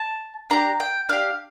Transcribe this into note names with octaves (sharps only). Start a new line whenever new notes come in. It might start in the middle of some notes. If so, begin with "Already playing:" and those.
Already playing: A5
D4 G4 A#5
G5
D4 G4 F5